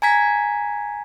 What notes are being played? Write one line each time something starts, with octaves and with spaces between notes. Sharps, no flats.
G#5 A#5 G#6 B6